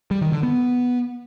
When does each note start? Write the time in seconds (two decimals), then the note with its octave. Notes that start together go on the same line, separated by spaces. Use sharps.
0.11 G3
0.22 D#3
0.32 D3
0.43 B3